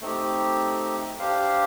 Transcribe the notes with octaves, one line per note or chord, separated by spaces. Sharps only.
A3 C4 D#4 G4
D4 G4 C5 F5